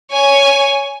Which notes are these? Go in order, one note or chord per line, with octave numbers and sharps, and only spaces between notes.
C#5 G#5